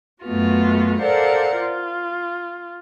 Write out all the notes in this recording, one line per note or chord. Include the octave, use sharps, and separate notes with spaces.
F#2 A3 B3 F4 F#4
A4 A#4 C5 D5 F5 F#5
F4